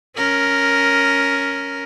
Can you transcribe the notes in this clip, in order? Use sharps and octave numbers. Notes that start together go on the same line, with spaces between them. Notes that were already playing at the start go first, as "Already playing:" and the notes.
C#4 A#4